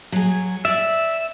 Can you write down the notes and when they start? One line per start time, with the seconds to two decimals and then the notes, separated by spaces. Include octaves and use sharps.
0.12 F#3 G#4
0.65 D5 E5